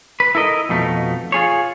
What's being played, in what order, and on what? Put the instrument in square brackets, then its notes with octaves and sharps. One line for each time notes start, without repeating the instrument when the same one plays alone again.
[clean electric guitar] B4
E4 A4 A#4 D#5
F2 B2 A3 D#4
F4 G#4 C#5